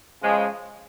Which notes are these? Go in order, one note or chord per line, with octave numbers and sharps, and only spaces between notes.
C#3 F3 G#3